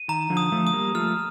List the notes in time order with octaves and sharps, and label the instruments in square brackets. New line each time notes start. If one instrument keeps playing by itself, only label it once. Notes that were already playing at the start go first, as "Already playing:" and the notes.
Already playing: [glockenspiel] D#7
[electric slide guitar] D#3 [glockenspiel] A#5
[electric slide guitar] D3 F3
[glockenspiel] D#6
[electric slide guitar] F3 A3
[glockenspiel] D#6
[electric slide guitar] G3 A#3
[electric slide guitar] F3 A3 [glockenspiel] F6